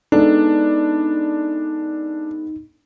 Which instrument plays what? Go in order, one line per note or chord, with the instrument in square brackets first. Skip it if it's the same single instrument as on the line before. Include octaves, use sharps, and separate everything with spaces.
[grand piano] G#3 B3 A4 [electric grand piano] D4 [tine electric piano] D#4